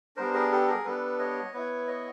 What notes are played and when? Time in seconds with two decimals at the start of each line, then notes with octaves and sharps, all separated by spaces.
0.16 G3 B3 D4 A#4 C5
0.34 G#4 A#4
0.52 G4 A4
0.68 G#4 A#4
0.85 G3 B3 D4 A4 B4
1.19 C#5 D#5
1.53 B3 E4 B4 C#5
1.88 C#5 D#5